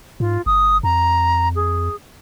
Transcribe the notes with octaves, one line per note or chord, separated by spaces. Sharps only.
G#2 F4
G1 D#6
F2 A#5
G#4